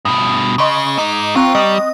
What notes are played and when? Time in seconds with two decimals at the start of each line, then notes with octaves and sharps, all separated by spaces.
0.05 G2 B2 D#6
0.58 C#3 D#5 C6 C#6
0.99 G#3 D#4 D6
1.36 C4 F4 G5 A#5 C#6 F#6
1.55 G3 D#5 D#6